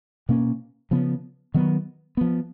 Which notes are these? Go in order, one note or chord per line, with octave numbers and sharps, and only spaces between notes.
B2 A#3 C#4
C#3 F3 B3
D#3 F#3 B3
F3 B3